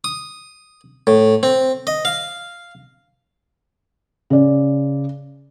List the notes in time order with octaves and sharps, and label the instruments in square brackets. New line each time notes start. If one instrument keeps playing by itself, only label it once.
[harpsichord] D#6
A2
C4
D#5
F5
[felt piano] C#3 D5